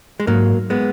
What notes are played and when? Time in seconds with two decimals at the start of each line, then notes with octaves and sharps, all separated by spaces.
0.20 G#3
0.27 G#2 F#3 A#3
0.70 G#3 B3